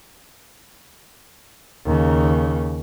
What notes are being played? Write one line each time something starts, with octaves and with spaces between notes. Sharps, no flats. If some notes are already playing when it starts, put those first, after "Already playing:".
D#2 C#3